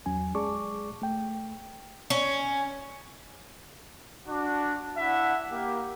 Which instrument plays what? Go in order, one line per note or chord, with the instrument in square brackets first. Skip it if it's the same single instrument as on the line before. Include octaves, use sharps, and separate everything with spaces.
[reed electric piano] E2 F#3 C#4 G#5
G#3 G#4 D5 A5 C#6 D6
A3 G5
[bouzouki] C#4
[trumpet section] D4 F#4
D4 E4 E5 F#5
A#3 G4